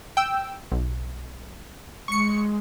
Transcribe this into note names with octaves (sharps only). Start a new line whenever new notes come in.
G5 E6
B1
G#3 C#6 C#7